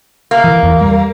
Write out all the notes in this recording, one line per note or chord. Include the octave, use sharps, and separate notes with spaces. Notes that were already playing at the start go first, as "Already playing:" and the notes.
A#3
E3
E2
G3